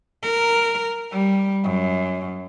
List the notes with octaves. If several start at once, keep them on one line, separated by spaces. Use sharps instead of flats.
A#4
G3
F#2